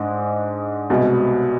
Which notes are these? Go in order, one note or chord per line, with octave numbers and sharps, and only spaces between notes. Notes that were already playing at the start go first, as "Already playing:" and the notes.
Already playing: G#2 G#3 D4
C2 B2 G#3